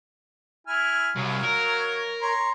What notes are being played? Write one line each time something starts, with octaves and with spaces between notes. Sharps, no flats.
E4 G#5 F6
C2 F#3 C#5 F5
A#4
C#5 A#5 C6